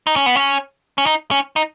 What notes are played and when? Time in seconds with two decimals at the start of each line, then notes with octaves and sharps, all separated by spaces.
0.07 D#4
0.16 C#4
0.26 B3
0.36 C#4
0.98 C#4
1.06 D#4
1.31 C#4
1.56 D#4